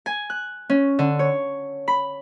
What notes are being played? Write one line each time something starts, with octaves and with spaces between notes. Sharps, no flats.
G#5
F#6
C#4
D3
C#5
B5